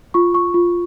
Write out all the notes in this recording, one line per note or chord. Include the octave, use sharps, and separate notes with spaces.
F4 C#6
C#6
F4